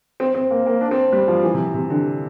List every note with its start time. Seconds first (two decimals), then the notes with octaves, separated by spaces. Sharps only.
0.20 C4
0.34 C4
0.51 A#3
0.66 A#3
0.81 D4
0.91 C4
1.12 G3
1.28 F3
1.44 E3
1.54 C3
1.74 C3
1.90 D3